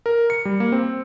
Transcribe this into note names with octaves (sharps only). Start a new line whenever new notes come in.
A#4
C#7
G3
A#3
C4